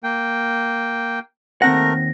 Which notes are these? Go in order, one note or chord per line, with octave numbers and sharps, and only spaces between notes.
A#3 G5
D#2 A3 C4 A#4 F#5 A#6